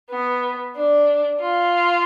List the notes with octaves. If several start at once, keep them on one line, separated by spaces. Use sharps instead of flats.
B3
D4
F4